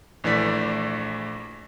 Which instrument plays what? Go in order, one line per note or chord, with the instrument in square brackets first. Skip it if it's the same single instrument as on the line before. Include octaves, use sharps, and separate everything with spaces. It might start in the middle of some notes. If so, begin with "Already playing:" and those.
[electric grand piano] A#1 E3 A3 D5 B6